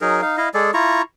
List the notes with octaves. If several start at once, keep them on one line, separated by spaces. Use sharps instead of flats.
F#3 D#4 G#4 A#4
D#4 F5
E4 D#5 F5
G#3 G#4 A4 D5
E4 F4 A#5 C#6